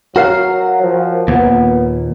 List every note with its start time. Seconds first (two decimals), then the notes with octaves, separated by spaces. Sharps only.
0.16 F#3 F#4 A#4 F5
0.82 F3
1.28 D#2 A#2 B3